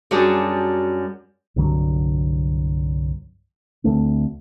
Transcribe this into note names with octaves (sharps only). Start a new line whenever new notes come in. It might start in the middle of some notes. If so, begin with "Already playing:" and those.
F#2 G3 D4 F#4 G#4 A5
C2 G2 D3 F#3
D2 A3 C4